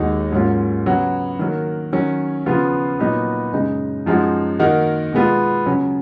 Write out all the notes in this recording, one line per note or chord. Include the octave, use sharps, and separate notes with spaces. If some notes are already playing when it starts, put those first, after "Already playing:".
Already playing: D#2 D#3 G#3 D#4 F#4
G#2 F#3 A#3 C#4 F4
C#3 F#3 B3 F#4
D#3 F#3 A#3
D#3 F#3 C#4
C#3 F3 B3 F4
A#2 F#3 B3 D#4
F#2 C#3 G#3 D#4
F#2 F3 G#3 D#4 F#4
D#3 A#3 D#4 F#4
B2 G#3 B3 F4
C#3 F#3 C#4